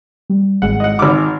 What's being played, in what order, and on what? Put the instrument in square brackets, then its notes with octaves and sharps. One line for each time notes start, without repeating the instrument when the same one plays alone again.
[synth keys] G3
[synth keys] G#1 G#3 [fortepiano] F#5
[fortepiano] D#5 F#5
[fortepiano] G#1 D6 [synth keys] F6